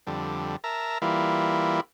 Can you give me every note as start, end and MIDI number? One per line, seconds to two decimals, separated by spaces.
0.07 0.56 41
0.07 0.56 50
0.07 0.56 55
0.64 0.98 70
0.64 0.98 76
0.64 0.98 81
0.64 0.98 82
1.02 1.81 52
1.02 1.81 55
1.02 1.81 58
1.02 1.81 64
1.02 1.81 65